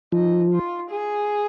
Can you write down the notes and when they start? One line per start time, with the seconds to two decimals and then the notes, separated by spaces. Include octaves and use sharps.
0.12 F3 D#4
0.52 F4
0.91 G#4